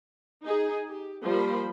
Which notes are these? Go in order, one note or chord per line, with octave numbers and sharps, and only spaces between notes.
D#4 G#4
G4
F3 G3 A#3 C5 B5